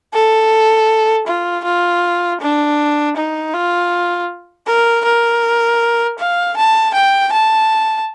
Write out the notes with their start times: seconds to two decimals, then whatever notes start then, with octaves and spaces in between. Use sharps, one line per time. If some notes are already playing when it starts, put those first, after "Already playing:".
0.14 A4
1.27 F4
1.64 F4
2.41 D4
3.17 D#4
3.53 F4
4.67 A#4
5.04 A#4
6.19 F5
6.56 A5
6.94 G5
7.32 A5